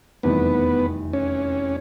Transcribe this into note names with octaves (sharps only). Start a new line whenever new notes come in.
F1 E2 C3 D#3 G3 B3
C#4